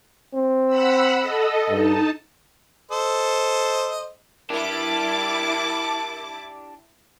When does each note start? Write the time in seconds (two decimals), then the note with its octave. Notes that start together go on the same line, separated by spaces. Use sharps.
0.34 C4
0.67 F#5 B5 E6
1.19 A4 D#5
1.70 G2 D#4 A5
2.91 A4 C5 D#5
4.50 D4 E4 G4 A#4 A5 D6